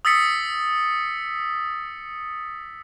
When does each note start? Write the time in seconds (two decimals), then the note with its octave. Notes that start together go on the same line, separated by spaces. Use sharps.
0.05 D#6 E6 A6 B6 C#7